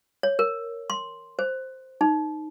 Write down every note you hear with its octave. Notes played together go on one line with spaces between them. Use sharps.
C#5
A#4
C6
C5
D#4